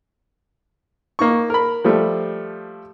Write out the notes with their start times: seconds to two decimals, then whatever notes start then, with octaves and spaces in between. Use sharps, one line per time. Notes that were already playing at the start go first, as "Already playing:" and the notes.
1.19 A#3 D#4 C#6
1.50 A#4 B5
1.84 F3 G3 A3